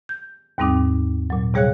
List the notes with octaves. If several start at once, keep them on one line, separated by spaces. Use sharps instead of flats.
G6
D#2 G#2 G3 C4 D#4 D6
A#2 F#3
C3 G3 G#4 C#5 F5 F#6